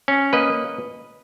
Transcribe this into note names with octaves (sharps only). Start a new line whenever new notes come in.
C#4
A#3 B4 D#5